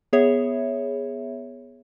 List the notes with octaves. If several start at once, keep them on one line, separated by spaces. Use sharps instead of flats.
B3 G#4 C#5 E5